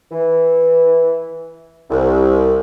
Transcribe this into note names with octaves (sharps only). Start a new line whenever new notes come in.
E3
C2